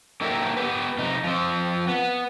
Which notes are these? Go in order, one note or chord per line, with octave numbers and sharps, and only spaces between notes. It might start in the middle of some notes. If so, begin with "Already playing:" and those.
A#3 D#4 E4 G4 A4 A#4
B3 G4 B4
C3 D#4
F3 C4
B3